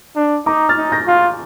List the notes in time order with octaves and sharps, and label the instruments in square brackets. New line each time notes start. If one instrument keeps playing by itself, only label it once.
[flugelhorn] D4
[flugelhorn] D#4 [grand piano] A#5 D6
[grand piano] F6 A6
[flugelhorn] D#4
[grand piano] G6 A#6
[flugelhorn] F4